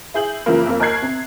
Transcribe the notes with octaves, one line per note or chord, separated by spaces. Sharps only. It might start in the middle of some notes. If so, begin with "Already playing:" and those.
E4 G#4 G6 F#7
F#2 C#3 E3 F3 A#3
F2 A#3
D#2 A#4 D#5 F#6 G#6 C7
C3